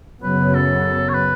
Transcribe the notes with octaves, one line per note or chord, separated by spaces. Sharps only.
F#2 C#3 F#3 B3 B4
A4
C#5
B4